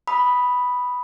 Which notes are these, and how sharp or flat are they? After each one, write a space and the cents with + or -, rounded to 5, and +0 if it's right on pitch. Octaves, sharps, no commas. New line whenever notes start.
B5 +0 D#6 +0